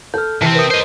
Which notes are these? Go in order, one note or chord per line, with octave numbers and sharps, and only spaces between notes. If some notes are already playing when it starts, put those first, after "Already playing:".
A4 F6 G6
C3 E3 C4 A5
A#4 B4 D#6
C5 D#5